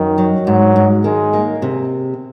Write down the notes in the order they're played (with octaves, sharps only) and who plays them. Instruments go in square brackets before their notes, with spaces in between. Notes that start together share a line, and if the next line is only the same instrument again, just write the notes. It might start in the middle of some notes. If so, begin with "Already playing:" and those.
Already playing: [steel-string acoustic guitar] F#2 [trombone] D#3
[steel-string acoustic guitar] F#3
[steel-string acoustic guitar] G#2 [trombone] F#3
[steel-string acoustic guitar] G#2
[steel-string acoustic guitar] D#3 [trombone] G#3
[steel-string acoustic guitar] A#3
C3